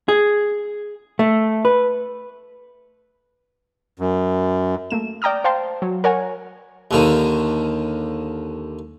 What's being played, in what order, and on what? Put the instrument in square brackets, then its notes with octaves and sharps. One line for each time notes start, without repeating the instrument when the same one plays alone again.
[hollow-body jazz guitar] G#4
A3
B4
[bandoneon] F#2
[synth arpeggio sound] A3 A#3 E7
D5 G5 A#5 D#6 F6
C5 F5 G5 A5 C6
F#3
A#4 C#5 F#5 G#5
[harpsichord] D#2 D3 D#3